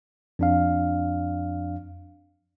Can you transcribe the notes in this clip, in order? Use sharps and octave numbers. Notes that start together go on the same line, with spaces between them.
F2 D4 F5